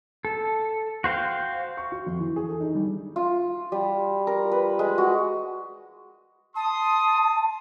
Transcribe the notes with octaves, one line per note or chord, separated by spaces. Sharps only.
A4
F#4 C5 F5 G5
C#6
F#4
F2
E3
G#4
A4
D#4
G3
F4
G3
A#4
B4
G#3
F#4
A5 C6 D#6